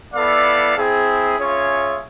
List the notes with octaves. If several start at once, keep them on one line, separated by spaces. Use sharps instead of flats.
B3 E4 A4 D5 F5
C4 E4 G#4
C#4 F4 G#4 C#5 E5